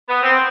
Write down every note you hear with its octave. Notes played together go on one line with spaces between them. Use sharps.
B3
C4